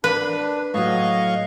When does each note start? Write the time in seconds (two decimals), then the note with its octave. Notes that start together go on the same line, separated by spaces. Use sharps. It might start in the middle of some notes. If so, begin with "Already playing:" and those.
0.04 D4 B4
0.74 A2 F#3 D#5 F5 C#6